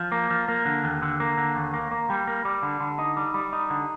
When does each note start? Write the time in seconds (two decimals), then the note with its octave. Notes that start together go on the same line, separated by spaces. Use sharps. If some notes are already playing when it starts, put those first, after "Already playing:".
Already playing: F3
0.12 A#3
0.30 F3
0.48 A#3
0.65 D3
0.84 D#2
1.02 D3
1.20 A#3
1.38 D3
1.56 D#2
1.74 A#3
1.91 A#3
2.10 G3
2.27 A#3
2.45 G3
2.63 D3
2.80 D3
2.99 D#4
3.17 G3
3.34 G3
3.53 D#4
3.70 D3